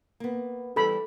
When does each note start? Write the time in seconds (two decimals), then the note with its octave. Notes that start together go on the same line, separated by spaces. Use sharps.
0.20 A#3 B3
0.76 E3 G3 E4 A4 B5